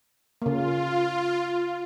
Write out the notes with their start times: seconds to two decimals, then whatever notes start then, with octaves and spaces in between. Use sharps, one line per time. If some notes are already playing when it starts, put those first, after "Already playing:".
0.42 C#3 A#3 F4